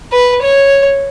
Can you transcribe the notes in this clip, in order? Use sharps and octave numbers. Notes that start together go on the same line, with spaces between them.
B4
C#5